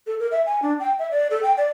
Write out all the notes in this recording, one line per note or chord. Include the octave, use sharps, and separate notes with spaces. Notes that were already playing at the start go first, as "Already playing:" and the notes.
A4
A#4
E5
G#5
D4
G5
E5
D5
A4
G5
D5